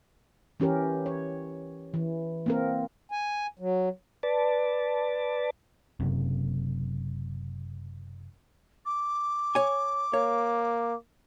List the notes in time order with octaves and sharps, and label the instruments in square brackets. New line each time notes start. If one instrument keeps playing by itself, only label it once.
[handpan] E3 C#4 G4 A#4
C#5
E3
A#3 C4 A#4
[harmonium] G#5
F#3
[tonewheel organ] B4 D5 A5
[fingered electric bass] F#1 F#2 C3
[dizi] D6
[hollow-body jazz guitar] C#5 G#5
[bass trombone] A#3 [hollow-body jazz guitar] C#5